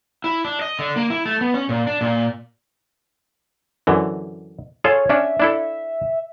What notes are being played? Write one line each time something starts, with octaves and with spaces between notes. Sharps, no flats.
E4
D4
D#5
D3
A#3
E4
A3
B3
C#4
A#2
D4
A#2
F#2 D3 E3
F4 G#4 A4 C#5
C#4 D4 E5
D4 E4 A4